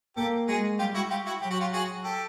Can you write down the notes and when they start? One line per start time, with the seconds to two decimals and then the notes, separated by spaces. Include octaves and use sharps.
0.17 A#3 G4 A4
0.48 G#3 F#4 G#4
0.79 G3 F4 G4
0.95 E4 F#4
1.10 F4 G4
1.26 E4 F#4
1.41 F#3 G4
1.51 F#4
1.60 F4 G4
1.73 F#4 G#4
2.04 G4 A4